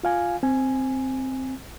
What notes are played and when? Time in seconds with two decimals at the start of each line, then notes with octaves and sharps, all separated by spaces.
0.03 F4 F5 G#5
0.43 C4 G#5